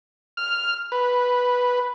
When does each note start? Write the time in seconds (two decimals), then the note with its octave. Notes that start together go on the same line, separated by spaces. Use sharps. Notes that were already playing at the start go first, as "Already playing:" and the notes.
0.37 F6
0.92 B4